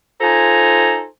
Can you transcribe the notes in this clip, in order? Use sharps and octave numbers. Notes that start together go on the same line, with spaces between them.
D#4 F4 A4 C5 G#5 A#5